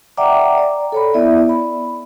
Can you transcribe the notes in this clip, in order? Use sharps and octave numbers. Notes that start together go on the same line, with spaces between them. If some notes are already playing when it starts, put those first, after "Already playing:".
D5 E5 F#5 G5 A#5 D6
D5
A4 C#5 B5
B3 E4 D5 E5
B5